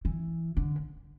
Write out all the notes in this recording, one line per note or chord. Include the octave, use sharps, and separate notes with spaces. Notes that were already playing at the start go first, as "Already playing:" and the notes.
E3
D3